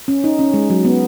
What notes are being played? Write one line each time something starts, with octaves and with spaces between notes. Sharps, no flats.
C#4
D#4
C#4
G#3
F#3
B3